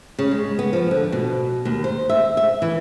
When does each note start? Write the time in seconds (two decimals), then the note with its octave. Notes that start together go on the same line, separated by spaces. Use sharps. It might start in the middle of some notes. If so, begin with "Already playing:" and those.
0.19 C#3
0.31 G#3
0.59 B3
0.73 F3
0.91 D3
1.12 B2
1.65 D#2
1.84 C5
2.09 E5
2.37 E5
2.62 E3